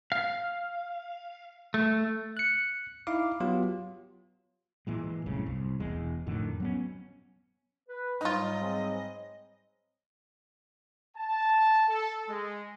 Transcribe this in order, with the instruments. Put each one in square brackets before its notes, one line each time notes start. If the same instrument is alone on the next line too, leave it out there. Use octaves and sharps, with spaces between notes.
[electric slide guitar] F5
A3
[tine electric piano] F#6 C#7
D#4 E4 F5 D6
F#3 B3 F4 G4
[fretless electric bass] A#2 E3 G#3
F#1 C2 A2 C#3
C2
E1 E2 G#3
F2 A2 D3 D#3
F#3 B3 C#4
[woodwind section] B4
[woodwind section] G#2 F#3 G3 [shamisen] D#4 F4 [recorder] D#5
[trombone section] G#3 C4
[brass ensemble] A5
A4
G#3